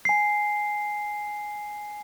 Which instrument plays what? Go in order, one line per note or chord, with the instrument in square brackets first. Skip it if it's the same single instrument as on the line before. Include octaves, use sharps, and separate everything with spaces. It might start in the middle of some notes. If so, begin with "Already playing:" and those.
[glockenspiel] G#5 C7